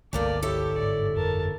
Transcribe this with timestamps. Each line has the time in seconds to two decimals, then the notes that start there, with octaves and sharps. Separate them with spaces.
0.13 G1 C#2 A3 A#3 D5 F5
0.42 E4 G4 A4 C#5
0.77 G#2 D5
1.16 F2 A#4 A5